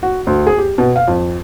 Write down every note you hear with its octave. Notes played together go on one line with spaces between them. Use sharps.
F#4
D2
G#4
G4
B2
F5
F2